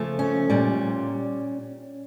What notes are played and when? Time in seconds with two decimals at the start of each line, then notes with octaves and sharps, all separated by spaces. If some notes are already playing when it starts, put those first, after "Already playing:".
Already playing: C#3 F3 A3
0.19 C#4
0.50 A#2 G3